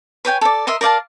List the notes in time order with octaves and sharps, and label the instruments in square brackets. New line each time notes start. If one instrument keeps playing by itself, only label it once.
[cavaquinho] B4 C#5 G5 G#5
A4 D5
A#4 D#5 E5 C6
A#4 D5 F5 A5